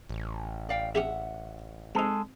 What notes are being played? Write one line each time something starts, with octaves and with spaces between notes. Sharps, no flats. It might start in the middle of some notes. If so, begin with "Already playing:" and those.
A1
D5 F5 G5
C#4 G4 G#4 E5 F#5
G#3 C4 D#4 G#4 A4